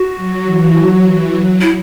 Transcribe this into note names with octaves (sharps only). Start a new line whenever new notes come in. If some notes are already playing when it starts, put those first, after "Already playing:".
Already playing: F#4
F#3
E3
F#3
E3
F#3
E4